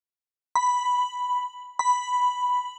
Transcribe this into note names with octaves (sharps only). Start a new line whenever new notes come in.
B5
B5